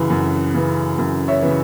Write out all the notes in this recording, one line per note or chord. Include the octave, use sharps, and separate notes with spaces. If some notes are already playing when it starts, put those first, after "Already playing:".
Already playing: F#2 C#3 E3
F#2
C#3 E3
F#2
C#5 E5
C#3 E3